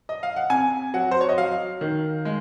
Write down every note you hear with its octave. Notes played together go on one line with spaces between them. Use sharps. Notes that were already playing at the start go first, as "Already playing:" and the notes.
D#5
F5
F#5
C3 G#5
F#3 F#5
C5
C#5
D#5
F#3 F5
D#3
G#3